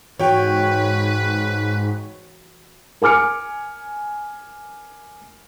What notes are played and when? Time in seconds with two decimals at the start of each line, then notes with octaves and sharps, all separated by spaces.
0.19 G#2 E3 F#4 B4 C#5 G5
3.02 A#4 G#5 D6 F6 C#7